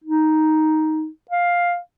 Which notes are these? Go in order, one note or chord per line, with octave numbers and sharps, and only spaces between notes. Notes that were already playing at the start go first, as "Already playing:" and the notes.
D#4
F5